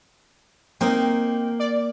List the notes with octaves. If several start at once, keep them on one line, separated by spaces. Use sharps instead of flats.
A#3 C4 D#4 A#4 G5
D5